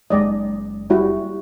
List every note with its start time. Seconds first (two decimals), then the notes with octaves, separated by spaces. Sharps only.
0.10 F#1 G#3 D#4 D5 D#5
0.90 G3 E4 F#4